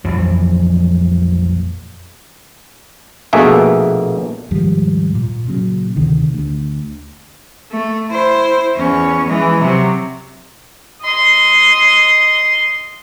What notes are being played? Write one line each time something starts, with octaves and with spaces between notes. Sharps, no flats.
A#1 F2 E3 F#3
A#1 B2 A3 A#3 G#4 E5
D#2 G#2 F3 G3
A#2
A#2 C#3 F#3
D2 C3 D#3
D2
A3
E4 C5
E2 C#4
E3 G#3
C3 F#3
D#5 C6